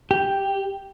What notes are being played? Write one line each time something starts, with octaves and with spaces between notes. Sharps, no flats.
G4